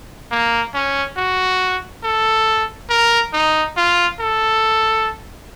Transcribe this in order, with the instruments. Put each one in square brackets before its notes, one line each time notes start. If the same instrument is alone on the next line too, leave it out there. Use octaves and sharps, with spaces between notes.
[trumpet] A#3
C#4
F#4
A4
A#4
D#4
F4
A4